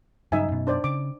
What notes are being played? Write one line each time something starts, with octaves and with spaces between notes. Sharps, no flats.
G2 C#3 F#3 D#4 E5 G#5
F#2 B2
D4 C5 D5
C#3 D6